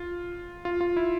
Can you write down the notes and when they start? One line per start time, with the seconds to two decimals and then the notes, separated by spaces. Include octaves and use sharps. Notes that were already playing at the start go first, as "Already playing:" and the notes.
Already playing: F4
0.65 F4
0.81 F4
0.97 E4